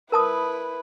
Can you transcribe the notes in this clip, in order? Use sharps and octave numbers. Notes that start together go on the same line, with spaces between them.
E4 A#4 B4 A5 D#6